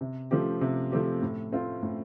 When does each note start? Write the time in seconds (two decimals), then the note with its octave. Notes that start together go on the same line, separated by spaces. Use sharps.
0.01 C3
0.31 F3 A3 C4 G4
0.61 C3
0.92 F3 A3 C4 G4
1.22 A2
1.52 A3 C4 F4
1.83 A2